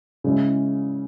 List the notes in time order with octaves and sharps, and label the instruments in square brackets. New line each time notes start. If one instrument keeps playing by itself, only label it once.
[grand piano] C#3 G#3 C#4 E4